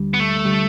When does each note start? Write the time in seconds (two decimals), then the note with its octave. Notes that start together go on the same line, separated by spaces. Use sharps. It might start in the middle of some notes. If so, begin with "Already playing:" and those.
Already playing: D2 D3 G3
0.14 B3
0.19 A3
0.45 D3 G3